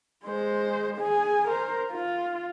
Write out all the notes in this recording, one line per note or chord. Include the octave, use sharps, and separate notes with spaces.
G#3 C5
G#4 G#5
A#4 C5
F4